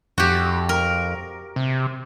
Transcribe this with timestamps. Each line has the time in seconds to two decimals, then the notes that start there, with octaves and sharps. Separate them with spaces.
0.18 F2 F#4 G4
0.69 A#4
1.56 C3